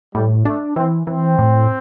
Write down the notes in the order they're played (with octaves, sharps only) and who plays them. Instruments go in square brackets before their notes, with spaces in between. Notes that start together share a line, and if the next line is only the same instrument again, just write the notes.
[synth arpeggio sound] A2 [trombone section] G3
[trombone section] A3 [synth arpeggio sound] D4
[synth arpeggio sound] E3 [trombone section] C4
[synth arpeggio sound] E3 [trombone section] C4
[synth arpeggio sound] A2